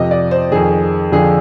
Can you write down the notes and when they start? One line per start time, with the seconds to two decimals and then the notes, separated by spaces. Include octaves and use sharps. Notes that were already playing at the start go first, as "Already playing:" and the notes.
Already playing: F2 C3 F3 D#5
0.11 D5
0.31 C5
0.52 F2 D#3 G#4
1.12 F2 D3 F3 G#4